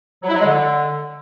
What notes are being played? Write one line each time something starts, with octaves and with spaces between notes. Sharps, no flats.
F#3
E4
F#3
G#3
D3